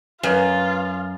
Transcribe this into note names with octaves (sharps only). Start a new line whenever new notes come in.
F#2 F4 B4 C#5